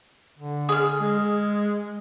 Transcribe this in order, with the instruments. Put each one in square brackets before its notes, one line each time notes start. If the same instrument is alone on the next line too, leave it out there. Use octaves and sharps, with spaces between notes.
[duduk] D3
[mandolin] G#4 F6
[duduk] G#3